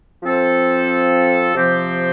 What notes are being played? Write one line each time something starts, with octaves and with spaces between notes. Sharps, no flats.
F3 C4 A4 C5
C3 F3 C4 G4